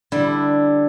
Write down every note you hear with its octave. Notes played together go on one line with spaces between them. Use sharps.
D3 G3 D4 E4